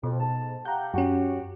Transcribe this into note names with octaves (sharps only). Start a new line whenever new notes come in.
F2 B2
G#2 A5
G4 F5 F#5 A#5 G6
F#2 C#4 F#4 G4